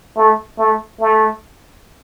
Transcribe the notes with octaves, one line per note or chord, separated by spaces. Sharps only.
A3
A3
A3